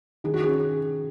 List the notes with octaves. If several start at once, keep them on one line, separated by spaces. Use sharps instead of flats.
D#3 G#4
F#4
C#4 G#4